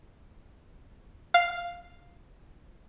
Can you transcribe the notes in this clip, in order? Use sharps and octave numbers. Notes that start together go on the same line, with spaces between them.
F5